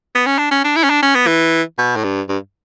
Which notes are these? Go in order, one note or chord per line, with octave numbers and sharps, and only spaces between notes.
B3
C#4
D4
C#4
D4
E4
C#4
D4
C#4
B3
E3
B2
A2
G2
G2